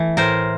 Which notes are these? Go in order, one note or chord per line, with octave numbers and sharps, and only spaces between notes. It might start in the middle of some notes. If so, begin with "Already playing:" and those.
Already playing: E3 A3
A2 A#4 C5